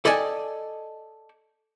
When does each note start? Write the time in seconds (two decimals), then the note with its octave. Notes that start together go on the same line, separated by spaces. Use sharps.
0.05 A4 D5 D#5 G5 G#5